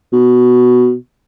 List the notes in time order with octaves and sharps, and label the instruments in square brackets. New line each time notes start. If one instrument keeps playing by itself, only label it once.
[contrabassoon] B2